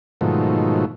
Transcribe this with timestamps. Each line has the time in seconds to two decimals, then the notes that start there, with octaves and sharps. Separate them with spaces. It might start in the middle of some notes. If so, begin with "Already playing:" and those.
0.21 G#2 B2 D#3 F3 F#3 A3